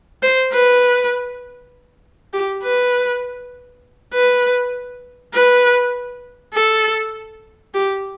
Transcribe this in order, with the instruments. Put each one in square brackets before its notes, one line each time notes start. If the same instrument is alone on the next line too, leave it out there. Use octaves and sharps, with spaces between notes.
[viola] C5
B4
G4
B4
B4
B4
A4
G4